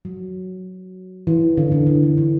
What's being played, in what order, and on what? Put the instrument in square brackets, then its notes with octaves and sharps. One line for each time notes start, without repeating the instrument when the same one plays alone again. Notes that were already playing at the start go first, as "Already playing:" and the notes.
[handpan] F#3
E3
D3
D3
D3
E3
E3